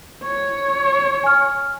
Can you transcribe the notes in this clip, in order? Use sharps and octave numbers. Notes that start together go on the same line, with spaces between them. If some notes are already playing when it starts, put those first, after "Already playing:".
C#5
G#5 F6